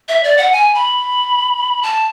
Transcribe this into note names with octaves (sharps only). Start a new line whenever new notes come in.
E5
D5
F#5
G#5
B5
A5